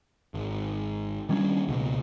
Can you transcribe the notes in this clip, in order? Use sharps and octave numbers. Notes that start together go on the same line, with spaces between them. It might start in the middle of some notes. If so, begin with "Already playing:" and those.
G#1
D#3 G3 C#4 D4
C#2 B2